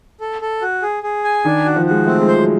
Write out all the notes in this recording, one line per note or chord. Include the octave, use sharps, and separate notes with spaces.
A4
A4
F#4
G#4
G#4
G#5
D#3 D4
F#4
F3
F#4
G#3
A3 C4
G#3
C5
F#3